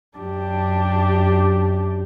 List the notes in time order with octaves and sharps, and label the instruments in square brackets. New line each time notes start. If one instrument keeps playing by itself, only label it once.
[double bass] F#2 [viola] D4 G4